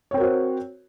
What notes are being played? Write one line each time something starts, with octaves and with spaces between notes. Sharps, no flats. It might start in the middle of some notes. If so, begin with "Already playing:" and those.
C4 F#4 A#4 C5 C#5